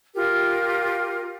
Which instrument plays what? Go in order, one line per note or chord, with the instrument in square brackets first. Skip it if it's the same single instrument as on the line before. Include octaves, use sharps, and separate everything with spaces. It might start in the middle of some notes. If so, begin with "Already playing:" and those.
[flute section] F4 G4 A#4